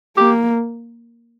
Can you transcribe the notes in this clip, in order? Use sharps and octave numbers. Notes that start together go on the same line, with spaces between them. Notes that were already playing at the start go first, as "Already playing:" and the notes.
A#3 G4